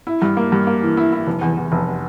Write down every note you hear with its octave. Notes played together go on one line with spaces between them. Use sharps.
E4
G2
A#3
G2
A#3
E3
E4
E4
F1
E2
E2
F1